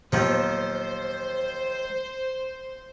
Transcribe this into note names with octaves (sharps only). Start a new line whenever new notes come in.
D#2 A#2 D#3 F3 F#3 B3 C5